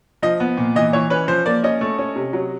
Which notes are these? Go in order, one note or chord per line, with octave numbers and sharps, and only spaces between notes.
F3 D#5
B3
A#2
E3 D#5
E3 C#5
C#4 B4
F3 C5
A#3 D5
C#4 D#5
A3
C#4
C3
F#3